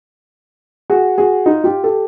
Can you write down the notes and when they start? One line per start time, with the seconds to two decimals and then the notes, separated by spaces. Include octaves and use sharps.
0.90 F#4 G#4
1.18 F#4 G#4
1.46 D#4 F4
1.64 F4 G4
1.83 G4 A4